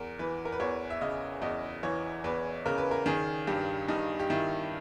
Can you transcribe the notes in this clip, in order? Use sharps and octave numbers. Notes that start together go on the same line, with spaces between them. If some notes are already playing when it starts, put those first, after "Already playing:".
Already playing: E2 A#4
E3 B4
A#4
B4
E2 C#5
E5
C#3 D#5
E2 D#5
E3 C#5
E2 B4
C#3 A#4
B4
A#4
D#3 G#4
G2 G4
G2 D#4
G4
D#3 E4